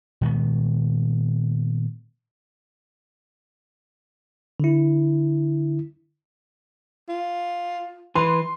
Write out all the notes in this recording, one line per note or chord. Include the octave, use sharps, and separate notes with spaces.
A#2 D#3 G#3 B3
D3 E4
F4
E3 B4 C6